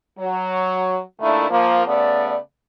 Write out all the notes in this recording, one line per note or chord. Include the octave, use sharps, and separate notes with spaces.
F#3
A#2 D#3 A3 D4 E4
F3 A#3
C#3 A3 B3 D5